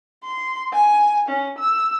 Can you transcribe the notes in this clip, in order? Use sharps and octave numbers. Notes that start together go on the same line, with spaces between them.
C6
G#5
C#4
E6